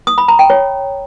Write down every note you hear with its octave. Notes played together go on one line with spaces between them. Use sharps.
D#6
B5
A#5
G5
C#5